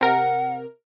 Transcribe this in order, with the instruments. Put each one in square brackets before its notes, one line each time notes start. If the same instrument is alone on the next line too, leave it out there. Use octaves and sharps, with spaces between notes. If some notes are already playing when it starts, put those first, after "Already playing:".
[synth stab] C3 A#4 [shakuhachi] F#5